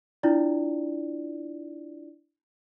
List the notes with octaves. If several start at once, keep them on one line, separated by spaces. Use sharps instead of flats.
D4 E4 F4 D5